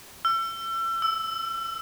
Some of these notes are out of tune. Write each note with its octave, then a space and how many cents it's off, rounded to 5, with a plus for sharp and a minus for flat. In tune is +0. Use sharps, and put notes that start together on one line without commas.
E6 +35
E6 +0